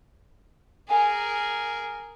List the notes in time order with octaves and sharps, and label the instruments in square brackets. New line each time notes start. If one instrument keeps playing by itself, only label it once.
[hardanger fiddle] G#4 A#4 [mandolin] F5 G#5 D#6